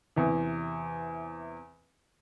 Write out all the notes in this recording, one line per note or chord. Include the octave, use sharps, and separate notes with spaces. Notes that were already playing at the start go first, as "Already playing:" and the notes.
E2 C3 E3